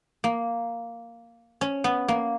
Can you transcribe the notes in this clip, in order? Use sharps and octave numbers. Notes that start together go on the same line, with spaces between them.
A#3
C#4
B3
A#3